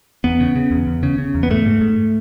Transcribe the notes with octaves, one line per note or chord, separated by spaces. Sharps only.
E2 B3
C#3
C#3
E2
E2
C#3
C#3
E2
B3
G#2 A3
G#2
G#2